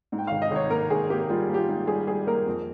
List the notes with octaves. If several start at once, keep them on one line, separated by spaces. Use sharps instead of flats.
G#2
G5
F5
G#1
D#5
G#1 C#5
A#3 A#4
G#1 G#4
A#3 G4
G3 F4
A#3
G4
F4
G#2
G3 G#4
G3 G#4
A#3 A#4
F2